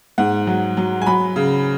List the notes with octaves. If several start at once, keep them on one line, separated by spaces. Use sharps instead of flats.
G#2 F#5
F#3
F#3
G#5
F#3 B5
C#3